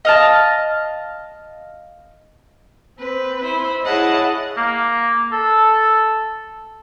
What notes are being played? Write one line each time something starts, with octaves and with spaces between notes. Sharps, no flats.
D#5 F5 A5
C4 B4
E4 C5 B5
E4 G#4 C#5 D#5 F#5 A5
A#3
A4